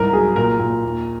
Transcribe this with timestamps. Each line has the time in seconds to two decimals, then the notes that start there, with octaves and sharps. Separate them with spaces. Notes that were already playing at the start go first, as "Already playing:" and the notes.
Already playing: C2 G#2 A#4
0.13 F#3 G#4
0.36 A#2 A#4
0.59 A#2
0.83 D#2